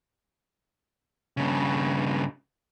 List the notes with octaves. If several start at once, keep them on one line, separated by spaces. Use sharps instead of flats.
G2 C#3